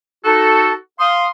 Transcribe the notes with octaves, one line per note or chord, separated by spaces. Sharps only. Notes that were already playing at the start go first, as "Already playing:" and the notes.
D#4 F#4 A4
F5 C6 D#6